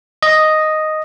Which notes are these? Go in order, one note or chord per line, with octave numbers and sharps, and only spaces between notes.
D#5